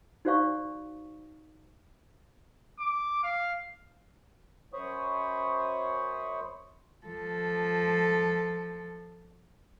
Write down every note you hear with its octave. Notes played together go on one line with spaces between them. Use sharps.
D#4 F#4 C5 D5 F5 C#6
D6
F5
F#2 C5 C#5 B5 C#6 D#6
F3 A4